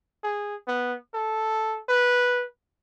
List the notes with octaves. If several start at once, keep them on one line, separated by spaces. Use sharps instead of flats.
G#4
B3
A4
B4